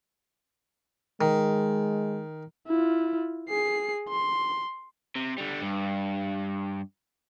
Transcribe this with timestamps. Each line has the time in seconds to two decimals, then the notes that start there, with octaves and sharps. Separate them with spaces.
1.21 D#3 G#3
2.67 E4 F4
3.49 G#4 C7
4.09 C6
5.16 C3
5.38 D3 G3
5.62 G2